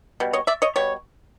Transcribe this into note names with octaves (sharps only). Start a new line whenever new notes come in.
B2 G3
C#5 D#5
D5 E5
C#5 D#5
B2 G3 C#5